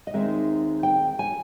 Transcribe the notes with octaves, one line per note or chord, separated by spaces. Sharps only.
D#5
D#2 D#3 G#3 C4 D#4 E5
G5
G#5